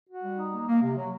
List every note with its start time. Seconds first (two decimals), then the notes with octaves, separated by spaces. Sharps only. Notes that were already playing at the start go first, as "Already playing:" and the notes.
0.08 F#4
0.23 G3
0.37 D#4
0.52 A#3
0.68 A#3
0.82 C3
0.97 F#3